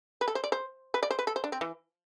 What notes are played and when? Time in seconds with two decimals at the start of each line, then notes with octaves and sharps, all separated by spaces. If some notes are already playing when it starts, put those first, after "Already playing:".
0.21 B4
0.28 A4
0.35 C5
0.44 D5
0.52 C5
0.94 B4
1.03 D5
1.11 C5
1.19 B4
1.27 A4
1.36 C5
1.44 D4
1.52 C4
1.61 E3